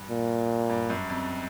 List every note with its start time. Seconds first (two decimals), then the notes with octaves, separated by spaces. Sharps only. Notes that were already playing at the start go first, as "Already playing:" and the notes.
Already playing: G2
0.10 A#2
0.70 G2
0.90 F#2
1.10 F2